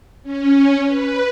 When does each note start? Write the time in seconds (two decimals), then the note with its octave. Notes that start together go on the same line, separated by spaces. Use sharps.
0.23 C#4
0.84 B4